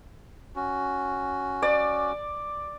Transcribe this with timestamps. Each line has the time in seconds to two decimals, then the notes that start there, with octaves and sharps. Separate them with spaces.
0.56 C#4 F#4
1.62 D5